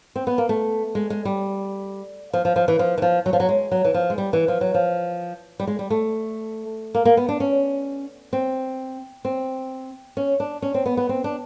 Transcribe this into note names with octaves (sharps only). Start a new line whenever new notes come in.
C4
B3
A#3
A3
G#3
G#3
G3
F3
F3
F3
E3
F3
E3
F3
F#3
F3
F#3
G#3
F#3
E3
F3
G#3
G3
E3
F3
F#3
F3
G3
G#3
G3
A3
A#3
A#3
B3
D4
C#4
C4
C4
C#4
D4
C#4
C4
B3
B3
C4
D4